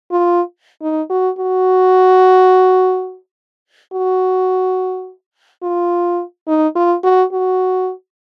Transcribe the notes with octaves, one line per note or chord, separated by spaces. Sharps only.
F4
D#4
F#4
F#4
F#4
F4
D#4
F4
F#4
F#4